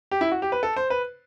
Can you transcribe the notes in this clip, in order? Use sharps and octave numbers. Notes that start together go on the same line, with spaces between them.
G4
E4
F#4
G4
B4
A4
C5
B4